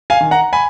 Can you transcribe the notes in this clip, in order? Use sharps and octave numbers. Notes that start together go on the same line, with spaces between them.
F5 G#5
D#3
F#5 A#5
G#5 B5